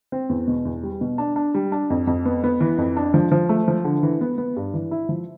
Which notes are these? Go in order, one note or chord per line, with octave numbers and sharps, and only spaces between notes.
C4
E2
B2
E2
G3
B2
D4
D4
G3
D4
F2
F2
B3
B3
E3
F2
D4
F3
F3
A3
F3
D3
E3
B3
B3
G2
E3
E4
F3